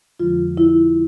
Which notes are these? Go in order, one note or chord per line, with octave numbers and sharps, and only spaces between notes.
F2 D3 F3 G#3 F4
E4